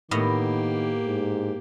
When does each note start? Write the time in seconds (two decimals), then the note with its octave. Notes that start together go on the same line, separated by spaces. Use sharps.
0.11 A2 D#3 A#3 B3 G4 D#5
1.07 G#2